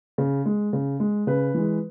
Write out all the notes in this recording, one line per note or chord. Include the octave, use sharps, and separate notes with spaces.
C#3
G#3
C#3
G#3
C#3 B4
E3 G#3